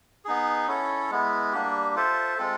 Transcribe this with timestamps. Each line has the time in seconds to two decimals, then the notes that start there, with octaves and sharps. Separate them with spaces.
0.25 B3 D#4 G#4
0.67 C#4 E4 A4 C#5
1.11 G#3 B3 E4
1.52 G3 A#3 D4 G4
1.96 F4 A4 C5 E5
2.38 G#3 C4 F4 A4